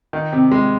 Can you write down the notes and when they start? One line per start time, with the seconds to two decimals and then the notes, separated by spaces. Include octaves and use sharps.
0.13 D#3
0.32 C3
0.51 G#3